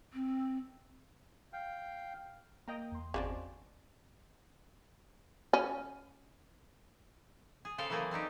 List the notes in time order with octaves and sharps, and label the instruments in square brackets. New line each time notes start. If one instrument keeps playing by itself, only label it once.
[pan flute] C4
[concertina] F5 G5
[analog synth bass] A#3 [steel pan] D#5 G5 A#5
[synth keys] E2 C6
[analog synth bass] G1 [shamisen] C#3 G#3 C4 [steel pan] F#4 D5 A5
[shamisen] C#4
[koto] G#4
C#3 A4 C5 F5 G5
E3 F#3 A3 A#3 G#4 D5
C4 D4 D#4 G4